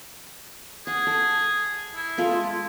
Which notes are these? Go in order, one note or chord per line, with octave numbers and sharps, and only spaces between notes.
G#4 F#5
A4
E4
G#3 F4 A4